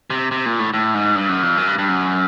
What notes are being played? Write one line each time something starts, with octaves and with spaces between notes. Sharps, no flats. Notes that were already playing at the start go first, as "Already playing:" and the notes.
C3
C3
A#2
A2
A2
G#2
G2
F#2
F2
F#2
G2
G2
F#2